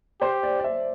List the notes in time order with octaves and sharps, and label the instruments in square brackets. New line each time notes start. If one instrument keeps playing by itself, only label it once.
[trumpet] G4 [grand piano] C5
[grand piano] D5
D5
E5